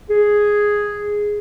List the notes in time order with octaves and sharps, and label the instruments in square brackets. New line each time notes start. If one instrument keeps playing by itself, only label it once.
[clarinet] G#4